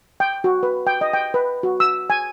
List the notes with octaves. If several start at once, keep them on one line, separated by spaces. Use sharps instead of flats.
G5
F#4
B4
G5
D#5
G5
B4
F#4
E6
G#5